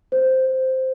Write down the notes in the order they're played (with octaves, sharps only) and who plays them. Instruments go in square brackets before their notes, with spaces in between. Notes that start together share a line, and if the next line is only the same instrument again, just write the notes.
[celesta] C5